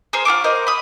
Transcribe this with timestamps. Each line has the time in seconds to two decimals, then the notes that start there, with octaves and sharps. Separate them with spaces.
0.13 G#4 A#4 C5
0.25 F4 A4 C#6 D6
0.44 A#4 C5 D#5
0.67 B5 D#6